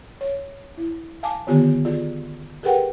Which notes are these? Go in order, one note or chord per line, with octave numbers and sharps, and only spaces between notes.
C#5
E4
F5 G#5 A5 D6
D3 D#3 B3 F4 G4 G#5
F4 G#4 D5
G4 G#4 A#4 B4 F#5 G5